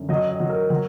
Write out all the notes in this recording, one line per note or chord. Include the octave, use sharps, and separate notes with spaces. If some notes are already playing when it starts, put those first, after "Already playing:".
Already playing: F#2 D3
F#3 D#5
D#5
F#3
A#4
F#3